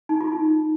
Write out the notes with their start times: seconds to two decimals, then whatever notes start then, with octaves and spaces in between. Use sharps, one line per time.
0.09 D#4
0.21 F4
0.32 D#4